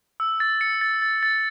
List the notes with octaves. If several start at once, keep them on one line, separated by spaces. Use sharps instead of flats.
E6
A6
C#7
A6
A6
A6